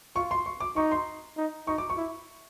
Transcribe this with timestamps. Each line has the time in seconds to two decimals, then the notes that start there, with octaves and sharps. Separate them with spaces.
0.16 F4 C#6
0.31 C6
0.46 C#6
0.60 D6
0.76 D#4 C#6
0.92 C6
1.37 D#4
1.67 D#4 C#6
1.78 D6
1.90 C#6
1.97 E4